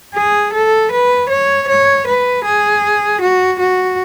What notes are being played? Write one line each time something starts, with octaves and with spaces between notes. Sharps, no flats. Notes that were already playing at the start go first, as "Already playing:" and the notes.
G#4
A4
B4
C#5
C#5
B4
G#4
F#4
F#4